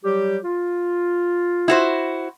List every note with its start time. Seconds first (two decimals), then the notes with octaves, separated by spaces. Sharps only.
0.04 F#3 G3 G4
0.44 F4
1.68 E4 F#4 C5